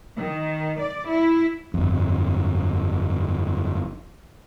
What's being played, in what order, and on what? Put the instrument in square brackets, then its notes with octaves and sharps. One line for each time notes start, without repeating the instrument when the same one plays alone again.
[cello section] D#3
D5
E4
[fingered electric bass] G1 F2